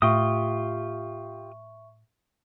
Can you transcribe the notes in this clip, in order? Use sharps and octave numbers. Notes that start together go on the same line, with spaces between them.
A2 F4 G4 E5 C#6 D#6